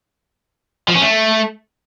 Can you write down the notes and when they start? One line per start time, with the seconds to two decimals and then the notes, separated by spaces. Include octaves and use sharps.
0.88 F3
0.95 C#4
1.02 A3